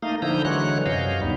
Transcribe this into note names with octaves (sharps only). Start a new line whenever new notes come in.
A3 A#3 D#4 F5 D#6
D3 F3 D#4 E4 A#5 G6
D3 E3 F#3 G#3 C#5 F#6
F#2 C3 C#5 D#5 F5 G6
D2 G3 B3 D#4